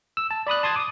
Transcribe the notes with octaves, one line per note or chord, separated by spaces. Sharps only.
E6
A5
D5 B5 D#6 F#6
A5 C6 D#6 G#6 A6
D6 D#6